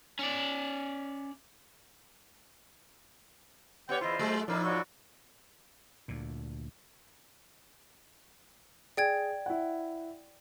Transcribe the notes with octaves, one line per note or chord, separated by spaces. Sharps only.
C#4 D5
B3 G4 C#5 D5 F#5 G5
E2 E4 F4 C5 D#5
F#3 G#3 A3
A2 F3 D#4 A#4 D5
F#4 C#5 D5
D2 A#2
G#4 D5 G5 G#6
E4 F#5